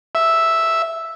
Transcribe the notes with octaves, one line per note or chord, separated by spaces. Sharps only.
E5